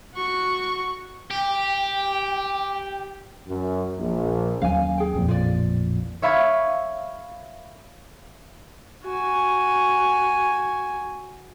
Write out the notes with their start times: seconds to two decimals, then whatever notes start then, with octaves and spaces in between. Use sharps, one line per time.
0.14 F#4 C#6
1.31 G4 G5
3.48 F#2
3.99 A#1
4.62 D#2 F#3 C#4 F5 G#5
4.98 G#4 G5
5.14 A1 F2 A#2
5.28 F4 D5
6.22 C#5 E5 F5 B5 C#6 G#6
9.04 F#4 G#5